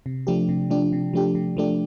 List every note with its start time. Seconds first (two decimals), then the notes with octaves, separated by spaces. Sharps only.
0.06 C3
0.27 F3 A3 D4 G4
0.49 C3
0.70 F3 A3 D4 G4
0.93 C3
1.13 F3 A3 D4 G4
1.35 C3
1.57 F3 A3 D4 G4